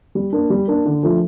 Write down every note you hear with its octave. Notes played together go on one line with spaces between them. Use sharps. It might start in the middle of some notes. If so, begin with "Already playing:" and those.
G3
A#3 D4
G3
A#3 D4
D3
F3 A3 D4 F4